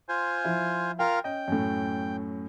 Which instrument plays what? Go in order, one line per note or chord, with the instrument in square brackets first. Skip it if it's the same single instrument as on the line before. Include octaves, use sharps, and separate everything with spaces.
[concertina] F4 C5 G#5
[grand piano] F3 E4
[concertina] F4 A#4 F5 [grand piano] G5
[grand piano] C#4 D#5 [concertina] G5
[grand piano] F#2 A2